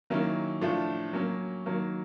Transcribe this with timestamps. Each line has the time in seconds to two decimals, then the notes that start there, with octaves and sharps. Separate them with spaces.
0.10 D#3 F#3 A#3 C#4 E4
0.61 A2 F3 A3 D4 F4
1.13 F#3 A#3 C#4
1.66 D#3 F#3 A#3